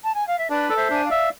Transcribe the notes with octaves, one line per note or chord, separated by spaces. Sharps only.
A5
G#5
F5
E5
D4 B4 D5
A4 D5
C5 E5
D4 G#5
D5 F5
E5